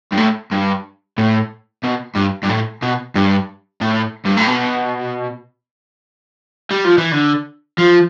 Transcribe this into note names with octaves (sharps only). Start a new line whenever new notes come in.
G2
A2
G2
A2
B2
G2
G2
A2
B2
G2
A2
G2
A2
B2
G3
F3
E3
D3
F3